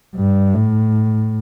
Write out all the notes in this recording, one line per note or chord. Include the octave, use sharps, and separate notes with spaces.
G2
A2